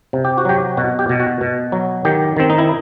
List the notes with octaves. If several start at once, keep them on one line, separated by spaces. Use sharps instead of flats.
C3
G4
F#4
F#3 G4
B2 F#4
G4
B2
F#4
B2
F#3
D#3 G4
D#3 C4
D#4
E4